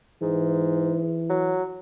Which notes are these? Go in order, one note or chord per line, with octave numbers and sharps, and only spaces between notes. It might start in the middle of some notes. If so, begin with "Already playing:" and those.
G#2 E3
F#3